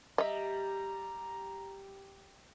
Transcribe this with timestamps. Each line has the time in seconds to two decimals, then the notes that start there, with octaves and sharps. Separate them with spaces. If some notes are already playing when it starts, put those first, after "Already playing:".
0.18 G3 D#5 E5 A#5